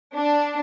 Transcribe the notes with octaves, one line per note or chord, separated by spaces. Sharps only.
D4